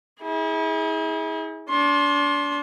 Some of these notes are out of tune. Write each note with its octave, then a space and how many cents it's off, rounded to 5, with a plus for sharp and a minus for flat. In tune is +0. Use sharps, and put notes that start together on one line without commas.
E4 -40 G#4 +0
D4 -30 C6 +25